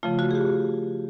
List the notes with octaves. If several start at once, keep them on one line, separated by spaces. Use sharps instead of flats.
C#3 F3 A3 F4
F#4
G#4
G4